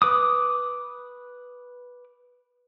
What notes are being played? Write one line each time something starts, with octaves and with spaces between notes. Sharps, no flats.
B4 D6 D#6